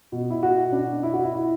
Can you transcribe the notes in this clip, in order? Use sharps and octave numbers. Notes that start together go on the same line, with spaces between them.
B2
E4
F#4
D4
E4
F#4
E4
E4